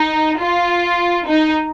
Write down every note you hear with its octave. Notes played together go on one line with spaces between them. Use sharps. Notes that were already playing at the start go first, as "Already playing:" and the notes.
Already playing: D#4
F4
D#4